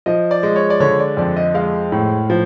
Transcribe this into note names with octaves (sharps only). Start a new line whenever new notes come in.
F3 D#5
D5
G#3
C#5
D5
D3 C#5
D5
F2 D5
D#5
G#3 F5
A2
F3